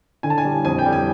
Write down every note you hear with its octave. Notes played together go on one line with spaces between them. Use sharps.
D3 G#5
A5
G#5
G3
F2 G#5
G5
G3
G#5